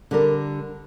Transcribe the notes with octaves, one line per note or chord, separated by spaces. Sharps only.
D3 G3 A#4